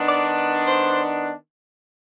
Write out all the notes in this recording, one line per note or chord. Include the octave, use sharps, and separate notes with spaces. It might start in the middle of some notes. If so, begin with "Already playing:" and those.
Already playing: D#3 B3 D4
D5
C5